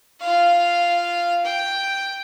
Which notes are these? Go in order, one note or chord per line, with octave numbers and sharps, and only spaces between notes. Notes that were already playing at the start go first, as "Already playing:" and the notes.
F4 F5
G5